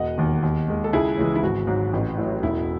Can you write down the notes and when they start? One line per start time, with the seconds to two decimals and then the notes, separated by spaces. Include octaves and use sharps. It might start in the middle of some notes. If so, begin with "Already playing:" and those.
Already playing: E1 D#5 F#5
0.18 D#2 D#3
0.43 D#2
0.68 D#3 G#3
0.84 A4
0.93 C#2 E4 G#4
1.17 C#3 E3 G#3
1.35 E4
1.42 G#1 F#4
1.67 G#2 F#3
1.93 A1
2.18 A2 F#3
2.43 E1 E4